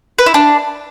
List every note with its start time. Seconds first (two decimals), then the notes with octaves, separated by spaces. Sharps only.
0.19 B4
0.26 E4
0.34 D4